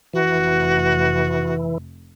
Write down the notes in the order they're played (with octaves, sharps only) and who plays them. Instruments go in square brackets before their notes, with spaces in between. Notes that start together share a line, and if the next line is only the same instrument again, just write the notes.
[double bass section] F1 [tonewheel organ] E3 [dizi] F#4